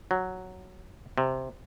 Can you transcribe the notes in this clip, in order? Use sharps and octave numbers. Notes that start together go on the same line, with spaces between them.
F#3
C3